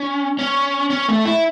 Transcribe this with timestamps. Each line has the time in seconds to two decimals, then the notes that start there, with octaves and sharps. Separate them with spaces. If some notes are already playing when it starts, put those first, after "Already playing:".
Already playing: C#4
0.39 C#4
0.90 C#4
1.08 A3
1.25 E4